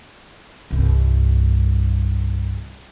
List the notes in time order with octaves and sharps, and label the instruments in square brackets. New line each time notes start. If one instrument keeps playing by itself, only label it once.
[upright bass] C2 G2